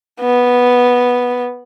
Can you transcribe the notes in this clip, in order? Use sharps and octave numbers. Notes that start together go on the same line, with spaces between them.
B3